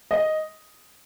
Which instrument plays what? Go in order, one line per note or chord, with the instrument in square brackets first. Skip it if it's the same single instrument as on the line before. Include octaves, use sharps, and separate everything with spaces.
[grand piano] D#5